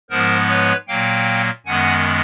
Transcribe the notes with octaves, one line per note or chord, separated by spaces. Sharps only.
G#2 F3 G#3 B3 A#4 C5
B4 C#5
A#2 F#3 A#3 F5 G5
F#2 D#3 G#3 B3 F#5 G#5